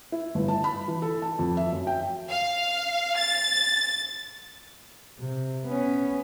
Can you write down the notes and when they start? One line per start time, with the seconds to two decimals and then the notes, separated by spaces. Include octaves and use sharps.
0.12 E4
0.35 G1
0.48 A5
0.64 B5
0.88 E3
1.02 A4
1.22 A5
1.39 F2
1.57 E5
1.73 F#2
1.87 G5
2.29 F5
3.16 A6
5.19 C3
5.66 B3 C#4